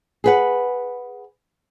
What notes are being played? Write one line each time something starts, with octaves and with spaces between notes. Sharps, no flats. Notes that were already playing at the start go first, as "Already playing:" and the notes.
G#4 B4 F#5